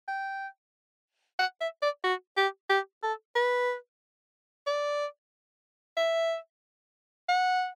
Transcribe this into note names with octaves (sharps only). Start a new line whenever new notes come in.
G5
F#5
E5
D5
F#4
G4
G4
A4
B4
D5
E5
F#5